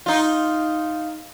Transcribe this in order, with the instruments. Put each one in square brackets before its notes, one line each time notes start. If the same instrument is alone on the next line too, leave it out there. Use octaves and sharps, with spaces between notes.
[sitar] D#4 F4